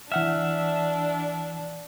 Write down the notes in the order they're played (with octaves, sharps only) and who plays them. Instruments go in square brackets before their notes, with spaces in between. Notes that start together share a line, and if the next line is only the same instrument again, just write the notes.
[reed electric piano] E3 F#5 F6 [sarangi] D4 [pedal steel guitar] E5